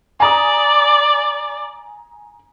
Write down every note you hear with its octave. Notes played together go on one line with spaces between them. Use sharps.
D5 G#5 A#5 D#6